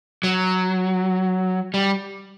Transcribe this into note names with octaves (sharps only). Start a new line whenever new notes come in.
F#3
G3